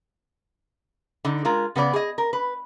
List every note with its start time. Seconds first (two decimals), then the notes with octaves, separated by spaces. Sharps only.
1.25 D3 D#4
1.45 G#3 F4 A#4
1.76 C#3 B3 A4 D5
1.93 G#4 D#5
2.18 A#4
2.33 B4